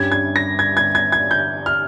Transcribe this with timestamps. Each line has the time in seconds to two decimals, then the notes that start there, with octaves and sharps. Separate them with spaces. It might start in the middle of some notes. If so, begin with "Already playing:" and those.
Already playing: G2 G3 C#4 G#6
0.12 G#6
0.36 A#6
0.59 G#6
0.77 G#6
0.95 G#6
1.12 G#6
1.31 G6
1.66 F6